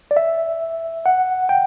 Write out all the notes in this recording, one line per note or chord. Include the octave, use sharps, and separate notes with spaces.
D5
E5
F#5
G5